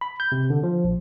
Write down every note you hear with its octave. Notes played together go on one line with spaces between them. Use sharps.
B5
G6
C3
D3
F3
A#1